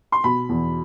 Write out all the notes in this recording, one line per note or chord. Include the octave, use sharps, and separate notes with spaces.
C6
B2 B5
E2